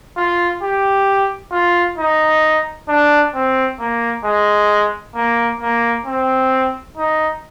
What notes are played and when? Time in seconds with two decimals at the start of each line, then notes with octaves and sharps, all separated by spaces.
0.17 F4
0.63 G4
1.52 F4
1.98 D#4
2.89 D4
3.34 C4
3.79 A#3
4.25 G#3
5.16 A#3
5.61 A#3
6.06 C4
6.98 D#4